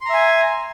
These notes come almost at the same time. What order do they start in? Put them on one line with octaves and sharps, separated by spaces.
C6 A#5 E5 G#5